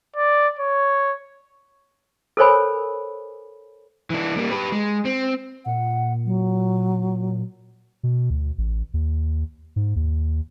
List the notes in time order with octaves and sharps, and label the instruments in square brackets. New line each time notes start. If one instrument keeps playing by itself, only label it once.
[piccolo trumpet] D5
C#5
[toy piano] A4 A#4 C5 C#5 G#5 B5
[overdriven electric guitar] E3 D4
G3 A#3
G4 B4
G#3
C4
[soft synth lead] A#2 [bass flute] F#5
[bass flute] F#3
[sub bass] B2
D2
A1
D#2
G#2
D#2